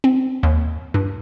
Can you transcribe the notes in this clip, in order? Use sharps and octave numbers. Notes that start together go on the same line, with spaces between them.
C4
D#2
G2